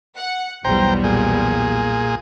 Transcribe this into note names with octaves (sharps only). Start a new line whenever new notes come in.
F#5
B1 E2 G3 C5 G5 A#5
A#2 G#4